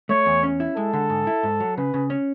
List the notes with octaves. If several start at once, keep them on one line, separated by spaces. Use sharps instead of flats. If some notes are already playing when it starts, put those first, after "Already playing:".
A3 C#5
E2
C#4
E4
G#3 A4
D3
G#2
E4
G#2
F#3
C#3 B4
C#3
C#4